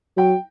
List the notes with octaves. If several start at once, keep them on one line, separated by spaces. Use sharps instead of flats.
F#3 G5